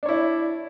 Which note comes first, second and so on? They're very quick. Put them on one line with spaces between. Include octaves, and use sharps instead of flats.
D4 C#5 E4